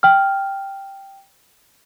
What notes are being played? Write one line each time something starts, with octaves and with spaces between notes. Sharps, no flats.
G5 F6